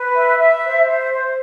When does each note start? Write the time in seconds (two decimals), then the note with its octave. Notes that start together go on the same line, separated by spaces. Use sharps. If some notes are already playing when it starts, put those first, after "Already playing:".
Already playing: B4
0.16 E5
0.39 E5
0.63 C5
0.87 C5
1.12 C5